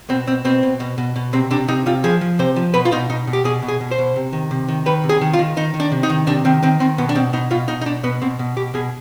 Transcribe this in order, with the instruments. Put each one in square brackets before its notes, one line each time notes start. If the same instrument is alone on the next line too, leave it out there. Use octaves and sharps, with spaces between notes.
[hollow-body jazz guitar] B2 C4
B2 C4
B2 C4
B2
B2
B2
B2
C3 C4
C3 D4
C3 D#4
C3 F4
F3 G#4
F3
C3 C5
F3
B2 B4
F4
B2 D#4
B2 D#4
B2
G4
B2 G#4
B2
G#4
B2
C5
B2
C3
D#3
C3
D#3
D#3 B4
C3
G#4
D#3
F4
D#3
D#3 D#4
D#3
D4
C3
D#4
D#3
C3 D4
D#3 C4
D#3 C4
D#3 C4
B2 B3
D4
B2 C4
B2 D#4
B2 F4
B2 D#4
D#4
B2 D4
B2 B3
B2 C4
B2
B2 G4
B2 G#4